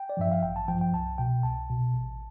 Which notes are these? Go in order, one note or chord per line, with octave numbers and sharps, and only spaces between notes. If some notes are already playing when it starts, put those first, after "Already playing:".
Already playing: G5
D5
G2 F3 E5
F5
A1 G5
A5
F3 G5
G2
G5
C2 A5
B2 G5
C2 A5
B2
A1